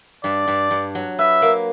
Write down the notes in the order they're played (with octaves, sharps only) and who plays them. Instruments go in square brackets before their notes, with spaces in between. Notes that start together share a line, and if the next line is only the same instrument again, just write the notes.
[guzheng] G2 [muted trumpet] D5
[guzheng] G2
G2
F#3
[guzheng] B4 [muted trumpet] E5
[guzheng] A#3